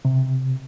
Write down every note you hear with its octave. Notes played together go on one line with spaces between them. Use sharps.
C3